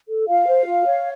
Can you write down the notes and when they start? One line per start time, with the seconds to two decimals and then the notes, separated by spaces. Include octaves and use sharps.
0.08 A4
0.27 F4 F5
0.47 C5
0.66 F4
0.85 C#5